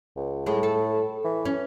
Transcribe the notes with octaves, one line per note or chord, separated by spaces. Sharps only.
C#2
A2 G#3
A4
E3
C#4